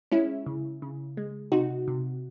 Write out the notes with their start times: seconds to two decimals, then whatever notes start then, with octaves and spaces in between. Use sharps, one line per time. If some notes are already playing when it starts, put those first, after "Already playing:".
0.12 G#3 C#4 E4
0.46 C#3
0.82 C#3
1.17 G#3
1.52 C3 D#4 F#4
1.88 C3